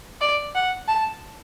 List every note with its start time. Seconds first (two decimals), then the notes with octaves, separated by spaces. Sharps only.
0.21 D5
0.55 F#5
0.88 A5